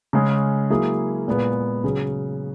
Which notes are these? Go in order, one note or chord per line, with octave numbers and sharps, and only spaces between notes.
C#3 G#3 C#4
F#3 A#3 E4 G#4
A#2 G#3 B3
C#3 F#3 C#4 G#4